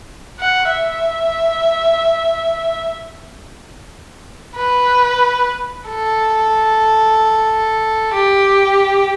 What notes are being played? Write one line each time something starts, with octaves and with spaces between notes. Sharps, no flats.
F#5
E5
B4
A4
G4